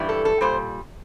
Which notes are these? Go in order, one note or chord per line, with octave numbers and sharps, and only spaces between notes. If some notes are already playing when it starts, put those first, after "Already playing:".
Already playing: G2 E3 G3
A4
A4
A#2 G3 C5